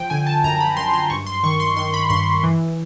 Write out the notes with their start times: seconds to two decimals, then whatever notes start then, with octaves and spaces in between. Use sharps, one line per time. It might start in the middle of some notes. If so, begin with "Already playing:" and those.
Already playing: F3 G5
0.10 D3 G#5
0.27 A5
0.44 F#2 A#5
0.60 B5
0.77 F#2 C6
0.94 C6
1.10 G2 C#6
1.26 C6
1.43 D#3 C#6
1.60 C6
1.76 D#3 C6
1.94 B5
2.10 G2 C6
2.44 E3